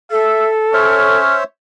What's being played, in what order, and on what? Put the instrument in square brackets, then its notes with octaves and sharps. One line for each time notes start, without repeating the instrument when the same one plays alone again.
[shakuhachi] A4 [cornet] E5
[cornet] C#4 [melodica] C5 C#5 E5 [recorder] F6